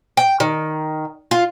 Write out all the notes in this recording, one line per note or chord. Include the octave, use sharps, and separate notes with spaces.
G5
D#3
F4